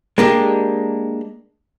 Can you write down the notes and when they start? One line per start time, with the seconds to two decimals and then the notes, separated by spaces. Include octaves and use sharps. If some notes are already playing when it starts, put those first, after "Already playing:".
0.18 G#3 A#3 D4 G4